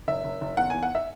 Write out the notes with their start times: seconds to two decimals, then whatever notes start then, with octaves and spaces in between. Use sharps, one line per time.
0.08 F#1 E5
0.24 F#1
0.41 F#1
0.57 E2 F#5
0.70 E2 G#5
0.83 F#5
0.95 E5